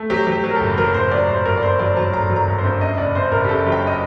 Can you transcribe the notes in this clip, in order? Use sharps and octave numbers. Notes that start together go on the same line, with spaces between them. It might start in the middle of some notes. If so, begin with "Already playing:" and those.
Already playing: A3
F#3 G4
F#3
G4
F#3
A#4
A4
F#1
F#3 A#4
F#1 C5
F#3 D5
F#1 C5
G1 A#4
D5
G1 C5
F#3 D5
F#3 A5
G1 A#5
F#3
A#5
G1
C5
G2
F#2 D#5
F#1 D5
F#2 C5
F#1 A#4
G4
F#2 A4
F#3
G5
D#5